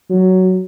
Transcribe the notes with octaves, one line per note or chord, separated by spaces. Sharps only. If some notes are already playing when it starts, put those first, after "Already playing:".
F#3